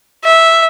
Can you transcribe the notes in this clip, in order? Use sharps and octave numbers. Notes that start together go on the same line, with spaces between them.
E5